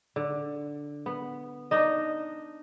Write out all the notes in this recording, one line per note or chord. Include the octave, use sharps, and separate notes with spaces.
D3
B3
D4 D#4 D#5